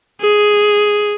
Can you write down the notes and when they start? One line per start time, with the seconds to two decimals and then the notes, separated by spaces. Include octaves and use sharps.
0.21 G#4